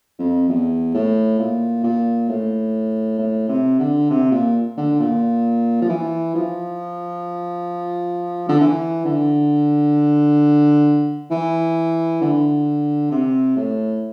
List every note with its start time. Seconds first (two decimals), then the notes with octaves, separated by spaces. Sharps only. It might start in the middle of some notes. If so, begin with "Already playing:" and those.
0.19 F2
0.49 E2
0.94 A2
1.39 A#2
1.84 A#2
2.29 A2
3.19 A2
3.49 C3
3.80 D3
4.10 C3
4.32 A#2
4.77 D3
5.00 A#2
5.82 F3
5.89 E3
6.35 F3
8.49 D3
8.60 E3
9.05 D3
11.31 E3
12.22 D3
13.11 C3
13.56 A2